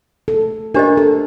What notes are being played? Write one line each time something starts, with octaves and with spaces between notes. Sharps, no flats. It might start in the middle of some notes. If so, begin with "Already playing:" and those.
A4
D4 G4 A#4 C5 D#5
A4